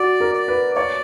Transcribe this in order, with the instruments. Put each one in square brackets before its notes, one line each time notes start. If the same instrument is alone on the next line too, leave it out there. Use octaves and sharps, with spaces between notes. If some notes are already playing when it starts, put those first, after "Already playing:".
Already playing: [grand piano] F#4 [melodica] D5
[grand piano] A#4
[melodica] D5
[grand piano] B4
[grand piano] C#5 [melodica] D5